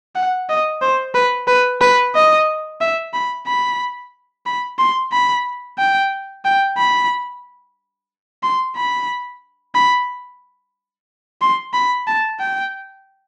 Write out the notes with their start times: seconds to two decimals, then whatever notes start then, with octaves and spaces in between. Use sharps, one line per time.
0.15 F#5
0.49 D#5
0.81 C5
1.14 B4
1.48 B4
1.81 B4
2.15 D#5
2.81 E5
3.14 B5
3.46 B5
4.46 B5
4.78 C6
5.12 B5
5.78 G5
6.45 G5
6.77 B5
8.43 C6
8.76 B5
9.75 B5
11.41 C6
11.74 B5
12.07 A5
12.40 G5